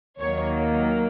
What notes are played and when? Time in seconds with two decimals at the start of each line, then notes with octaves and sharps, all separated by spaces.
0.19 D#2 D#3 F#3 A#3 C#5